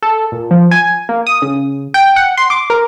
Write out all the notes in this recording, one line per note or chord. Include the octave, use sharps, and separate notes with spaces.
A4
A#2
F3
G#5
A#3
D#6
C#3
G5
F#5
C6
D6
A#4